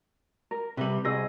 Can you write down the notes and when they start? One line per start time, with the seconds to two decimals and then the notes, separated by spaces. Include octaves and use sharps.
0.51 A#4
0.77 C3 G3 B4
1.05 C2 G#4 C5 D#5 E6 A#6